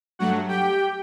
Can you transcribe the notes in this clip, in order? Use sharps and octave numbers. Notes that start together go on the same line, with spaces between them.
G2 F#3 A3 F#4 F#5
G4 G5